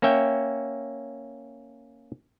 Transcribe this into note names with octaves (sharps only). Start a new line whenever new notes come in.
A#3 C#4 C#5 E5 G5